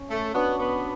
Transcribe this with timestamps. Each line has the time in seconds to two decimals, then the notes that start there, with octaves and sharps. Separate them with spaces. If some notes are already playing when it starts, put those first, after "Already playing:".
Already playing: C#4
0.10 A3
0.34 B3 D4 F#4
0.60 B3